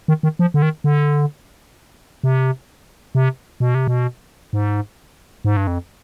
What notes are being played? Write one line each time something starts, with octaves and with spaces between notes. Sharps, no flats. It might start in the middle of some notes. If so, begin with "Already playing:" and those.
D#3
D#3
F3
D3
D#3
D3
C3
C3
B2
C3
B2
G#2
G#2
G2
F2